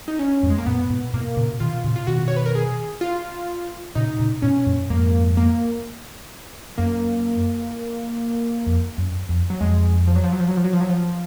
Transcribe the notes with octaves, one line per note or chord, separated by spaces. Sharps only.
D#4
C#4
F2 G#2
G#3
A#3
F#2 A#2 B3
G#2 B2
G#2 B2 A#3
A#2 C#3
B2 D#3 F4
A#2 C#3
F4
B2 D#3 F#4
C#5
B4
A#4
G#4
F4
A#2 C#3 D#4
A#2 C#3
G#2 B2 C#4
F#2 A#2
F2 G#2 A#3
A#3
F#2 A#3
F2
F#2
F2
F#3
F2 G#3
F3
F#3
F3
F#3
F3
F#3
F3
F#3
F3
F#3
F3